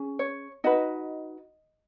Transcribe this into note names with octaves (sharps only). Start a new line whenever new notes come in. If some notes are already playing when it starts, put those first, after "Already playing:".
Already playing: C#4 G#4
C#5
D#4 F#4 B4 D#5